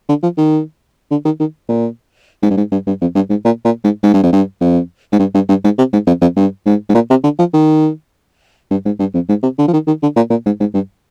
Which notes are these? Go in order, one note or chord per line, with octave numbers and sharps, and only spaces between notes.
D3
F3
D#3
D3
D#3
D#3
A#2
G#2
G2
G#2
G2
G2
F2
G2
G#2
A#2
A#2
G#2
G#2
G2
F2
G2
F2
G#2
G2
G2
G2
G#2
C3
G#2
F2
F2
G2
G#2
G#2
A#2
C3
D3
F3
D#3
G2
G#2
G2
F2
G#2
C3
D3
F3
D#3
D#3
D3
A#2
A#2
G#2
G#2
G2